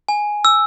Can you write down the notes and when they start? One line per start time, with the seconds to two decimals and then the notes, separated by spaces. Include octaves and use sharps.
0.09 G#5
0.45 E6